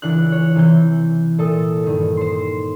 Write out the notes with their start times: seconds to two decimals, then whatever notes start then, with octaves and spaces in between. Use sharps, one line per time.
0.02 C#2 E3 D4 F#6
0.32 C#5
0.55 C3 E3 G6
1.38 A#2 A4 E5 D#6
1.84 G2 D#3
2.17 C5 C6